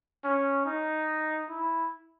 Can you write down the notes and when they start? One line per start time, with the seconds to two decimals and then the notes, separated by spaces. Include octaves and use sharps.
0.24 C#4
0.66 D#4
1.49 E4